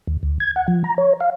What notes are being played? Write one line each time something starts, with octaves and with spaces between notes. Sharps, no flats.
D#2
D2
G#6
F#5
F3
A#5
C#5
F5